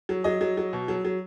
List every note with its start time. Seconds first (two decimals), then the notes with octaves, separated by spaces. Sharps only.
0.09 F#3
0.24 F#3 D#5
0.41 F#3
0.57 F#3
0.73 B2
0.88 F#3
1.05 F#3